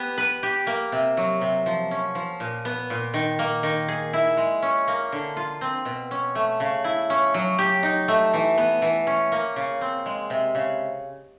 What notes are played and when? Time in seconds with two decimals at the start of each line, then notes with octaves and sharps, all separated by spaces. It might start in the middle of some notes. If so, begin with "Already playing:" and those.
Already playing: B3 G4
0.18 B4
0.43 G4
0.67 A#3
0.92 C3
1.17 F#3
1.41 C3
1.66 F3
1.91 C#4
2.15 F3
2.40 A#2
2.65 B3
2.90 A#2
3.14 D#3
3.39 A#3
3.63 D#3
3.88 G#4
4.13 E4
4.37 G#3
4.62 C#4
4.88 A#3
5.12 D3
5.37 F4
5.61 C4
5.85 B2
6.11 C#4
6.35 A3
6.60 C#3
6.84 E4
7.10 C#4
7.34 F#3
7.58 G4
7.83 D#4
8.08 A3
8.33 E3
8.58 B3
8.82 E3
9.07 C#4
9.32 A#3
9.56 C#3
9.81 C4
10.06 G#3
10.30 C3
10.55 C#3